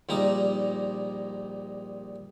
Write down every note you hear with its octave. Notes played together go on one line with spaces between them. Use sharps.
A#1 A#2 G3 D#4 A#5 D6